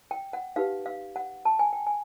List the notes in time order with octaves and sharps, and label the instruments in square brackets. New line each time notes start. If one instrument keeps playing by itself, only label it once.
[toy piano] G5
F#5
D#4 G4 B4 F5
F5
F#5
A5
G#5
G5
G#5